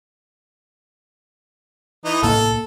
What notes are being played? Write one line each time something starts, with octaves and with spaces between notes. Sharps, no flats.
E3 D#4
C2 A2 A#3 A4